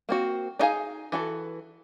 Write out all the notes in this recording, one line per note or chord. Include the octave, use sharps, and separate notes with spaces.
A#3 C4 F#4
D4 D#4 G#4 F5 G#5
E3 F#4 A4